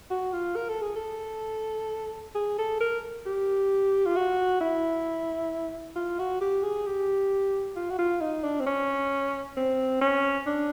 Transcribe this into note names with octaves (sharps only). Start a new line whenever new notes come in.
F#4
F4
A#4
A4
G#4
A4
G#4
A4
A#4
G4
F4
F#4
E4
F4
F#4
G4
G#4
G4
F4
F#4
F4
D#4
D4
C4
C#4
C4
C#4
D4